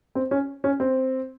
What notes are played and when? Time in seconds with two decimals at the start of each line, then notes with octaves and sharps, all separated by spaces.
0.15 C4
0.31 C#4
0.64 C#4
0.80 C4